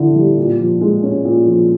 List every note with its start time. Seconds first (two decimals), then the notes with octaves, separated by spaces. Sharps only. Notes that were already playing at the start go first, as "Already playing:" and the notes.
Already playing: D3 E4
0.15 G3
0.37 A#2
0.59 F3
0.81 G#3
1.03 C#4
1.24 A#2
1.46 F3